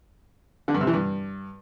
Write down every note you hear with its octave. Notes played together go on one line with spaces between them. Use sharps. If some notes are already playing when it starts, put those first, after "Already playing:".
D3
G2
C3
E3
G2